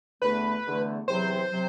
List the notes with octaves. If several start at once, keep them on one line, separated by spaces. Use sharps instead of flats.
E2 D3 A3 B4
E2 D3 A3
E2 C3 F#3 C5
C3 F#3